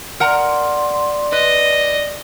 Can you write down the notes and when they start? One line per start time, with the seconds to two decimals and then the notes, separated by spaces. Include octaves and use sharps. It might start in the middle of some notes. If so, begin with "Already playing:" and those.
0.20 A#4 D5 F#5 A#5 C6
1.32 B4 D#5